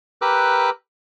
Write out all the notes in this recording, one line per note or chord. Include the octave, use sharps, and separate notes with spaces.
G4 A#4 B4 D6 E6 F#6